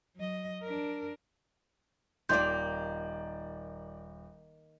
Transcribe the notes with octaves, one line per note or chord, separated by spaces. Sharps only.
F#3 D#5
D4 A#4
D#1 D#3 A#3 D5 C6 G6